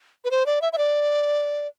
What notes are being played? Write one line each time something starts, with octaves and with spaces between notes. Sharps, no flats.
B4
C5
D5
E5
E5
D5